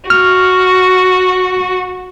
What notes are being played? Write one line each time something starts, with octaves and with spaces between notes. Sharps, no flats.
F#4 F6